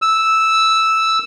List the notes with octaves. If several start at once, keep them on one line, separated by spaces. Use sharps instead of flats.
E6